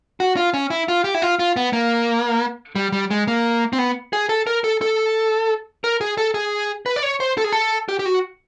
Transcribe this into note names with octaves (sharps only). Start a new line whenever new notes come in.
F#4
F4
C#4
E4
F4
G4
E4
F4
F4
B3
A#3
G3
G3
G#3
A#3
C4
B3
G#4
A4
A#4
A4
A4
A#4
G#4
A4
G#4
B4
D5
C#5
C5
A4
G#4
A4
G4
G4
F#4